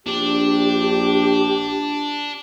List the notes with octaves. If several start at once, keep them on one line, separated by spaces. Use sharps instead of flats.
A#1 D4 G4